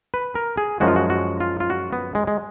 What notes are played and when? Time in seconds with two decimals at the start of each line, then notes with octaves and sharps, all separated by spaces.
0.14 B4
0.35 A#4
0.57 G#4
0.80 F#2 F3 G#3 F#4
0.88 F4
0.96 F#4
1.10 F#4
1.40 F4
1.60 F4
1.70 F#4
1.93 B3
2.15 G#3
2.27 G#3